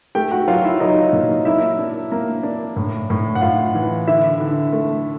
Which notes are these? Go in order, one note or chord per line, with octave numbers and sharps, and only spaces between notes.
A3 G4 G5
F#4 F#5
F#3 F4 F5
E4 E5
F#3 D#4 D#5
A#2
A#3 E4 E5
D4
A#3
D4
A2
A2
F#5
A2 F4 F5
E3
D3 E4 E5
D3
A3